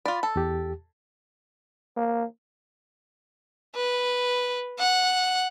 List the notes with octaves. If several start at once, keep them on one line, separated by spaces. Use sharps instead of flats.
F4 D5 B5
A4
E2 G4
A#3
B4
F#5